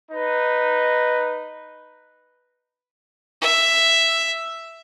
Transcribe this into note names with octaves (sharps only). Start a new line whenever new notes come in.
D#4 B4
E5